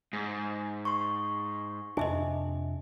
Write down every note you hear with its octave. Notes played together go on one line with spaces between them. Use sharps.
G#2
C6 C#6
F2 C3 D4 D#5 E5 G#5